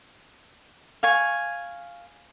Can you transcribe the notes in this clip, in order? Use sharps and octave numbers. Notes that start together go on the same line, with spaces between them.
F5 G#5 C#6